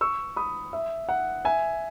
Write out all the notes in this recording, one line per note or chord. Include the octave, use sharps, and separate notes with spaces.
C#6 E6
B5 D#6
E5
F#5
E5 G#5